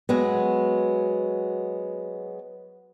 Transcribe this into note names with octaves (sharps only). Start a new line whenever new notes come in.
F#3 G#3 B3